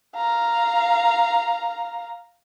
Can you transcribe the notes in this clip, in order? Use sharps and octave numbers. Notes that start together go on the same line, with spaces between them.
F5 A#5